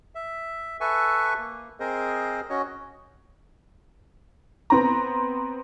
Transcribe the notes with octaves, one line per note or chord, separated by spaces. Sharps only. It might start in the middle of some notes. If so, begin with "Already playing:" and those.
E5
A4 B4 E5 G#5 C#6
A#3
C4 G#4 A#4 C5 D#5
C#4 F#4 C#5 D#5
B3 C4 A#5